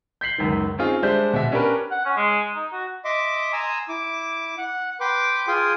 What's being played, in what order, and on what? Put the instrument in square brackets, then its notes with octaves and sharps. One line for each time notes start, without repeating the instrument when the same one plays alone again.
[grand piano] G6 B6 C7 F#7
C#2 F#2 D#3
C4 C#4 D#4 F4 G#4
G3 G#3 D4 C5 E5 G6
B2 E5
C#4 D4 G4 A#4 B4
[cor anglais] F#5
C#4
G#3
D#4
F#4
[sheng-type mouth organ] D#5 E5 C6 D6
G#5 A#5 C6 D#6 E6
E4 D6
F#5
B4 G5 C6 D6
F4 G#4 G5 G#5 C6 D#6